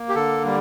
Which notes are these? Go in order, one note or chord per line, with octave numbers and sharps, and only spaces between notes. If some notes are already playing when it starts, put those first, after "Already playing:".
Already playing: A#3
G4
D3 A4
G3